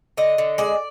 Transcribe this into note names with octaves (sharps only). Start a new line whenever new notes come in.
D3 D#5
D3
G#3 D5